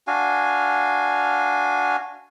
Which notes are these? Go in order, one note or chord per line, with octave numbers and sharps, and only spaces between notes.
D4 F#4 F5 G#5